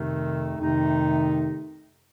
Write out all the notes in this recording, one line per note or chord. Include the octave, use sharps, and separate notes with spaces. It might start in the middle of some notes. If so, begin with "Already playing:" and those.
Already playing: F2 C3 D#3 A3 D#4
F2 C3 D#3 A3 D#4